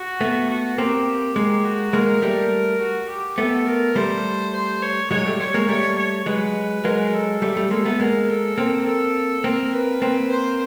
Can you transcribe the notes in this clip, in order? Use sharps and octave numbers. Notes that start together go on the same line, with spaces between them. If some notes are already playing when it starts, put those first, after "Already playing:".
Already playing: F#4
A3 B3
F#4
A#3 C4 G4
G#3 A#3
F#4
G#3 A#3 A#4
G3 A3
F#4
G4
A3 B3 A4
A#4
G3 A3 C5
C5
C#5
F#3 G#3 C#5
G3 A3
C#5
G#3 A#3
G3 A3 C#5
C#5
F#3 G#3 B4
F#3 G#3 A#4
A4
G3 A3
G3 A3
G#3 A#3 A4
A3 B3
G#3 A#3 A#4
A4
A#3 C4
A4
A#3 C4 A#4
B4
A#3 C4
C5